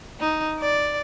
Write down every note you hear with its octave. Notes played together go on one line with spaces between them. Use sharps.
D#4
D5